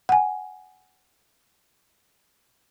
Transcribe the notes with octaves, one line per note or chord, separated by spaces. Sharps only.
F#5 G#5